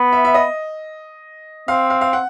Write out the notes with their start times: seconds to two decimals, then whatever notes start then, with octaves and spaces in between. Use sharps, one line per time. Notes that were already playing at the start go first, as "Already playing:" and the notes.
Already playing: B3
0.13 E5
0.25 E5
0.34 D#5
1.68 C4 F5
1.90 F5
2.01 F5
2.13 F#5